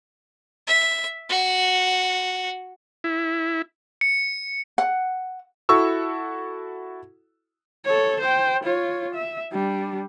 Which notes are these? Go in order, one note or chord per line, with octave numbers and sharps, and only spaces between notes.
E5
F#4
E4
C#7
F#5
E4 F#4 A4 C#6 E6
A4 C#5
C5 G5
F4 C#5
E5
G3 D4